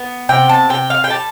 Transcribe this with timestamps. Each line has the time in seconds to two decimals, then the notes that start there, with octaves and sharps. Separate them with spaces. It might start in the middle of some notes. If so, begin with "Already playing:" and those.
Already playing: B3
0.29 C3 G5
0.49 A5
0.69 C3 G5
0.90 F5
1.04 G5
1.09 G3 A5